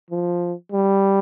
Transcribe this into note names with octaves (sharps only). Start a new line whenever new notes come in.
F3
G3